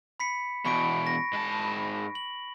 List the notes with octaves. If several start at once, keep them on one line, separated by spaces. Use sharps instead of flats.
B5 B6 C#7
E2 B2 B5 C#6 D7
A#6
G#2 A5
F#7